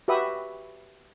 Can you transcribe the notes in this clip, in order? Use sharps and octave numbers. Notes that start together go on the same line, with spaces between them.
F#4 G4 B4 E5 B5 D#6